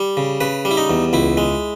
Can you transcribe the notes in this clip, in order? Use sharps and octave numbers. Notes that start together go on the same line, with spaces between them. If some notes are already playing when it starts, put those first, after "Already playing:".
Already playing: G3
C#3
C#3 B4
G3
E4
D#4
E2
C#2 E4
G#3